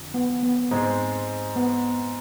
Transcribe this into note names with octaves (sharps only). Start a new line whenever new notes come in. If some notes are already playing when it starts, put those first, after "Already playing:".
Already playing: F2 D3
B3
B3
G#2 G#3 C4 G#4 C5
B3